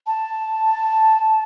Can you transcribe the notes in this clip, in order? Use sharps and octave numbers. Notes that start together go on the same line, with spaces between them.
A5